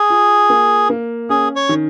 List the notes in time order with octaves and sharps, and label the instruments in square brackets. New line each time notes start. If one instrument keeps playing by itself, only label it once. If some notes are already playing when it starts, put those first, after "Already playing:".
Already playing: [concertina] G#4
[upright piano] F4
A#3
A#3
[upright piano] C#4 [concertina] G#4
[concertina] C#5
[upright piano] D#3